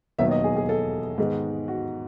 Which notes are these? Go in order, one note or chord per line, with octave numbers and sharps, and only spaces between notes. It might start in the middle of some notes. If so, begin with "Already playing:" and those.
E1 D#2 D#3 F#3 B3 E5
D#5
G#4
G#4
A4
G#2 D#3 G#3 B3
F#4